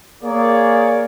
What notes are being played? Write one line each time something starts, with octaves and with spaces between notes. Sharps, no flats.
A#3 G#4 C#5 D5